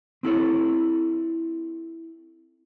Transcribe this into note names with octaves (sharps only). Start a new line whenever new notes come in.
C4 E4 A4 C#5